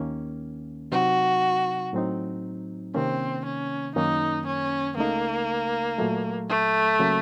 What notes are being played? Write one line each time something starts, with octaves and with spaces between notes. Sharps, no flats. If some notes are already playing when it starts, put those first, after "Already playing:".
Already playing: D#2 D#3 A#3 C#4
C3 F#3 C4 D#4 F#4
A2 F#3 C4 D#4
C3 D#3 A#3 C4 C#4
C#4
F#2 D#3 A#3 C#4 D#4
C#4
C#2 C#3 A3 A#3 D#4
A#2 F#3 A3
A3
C#3 F#3 A#3 C#4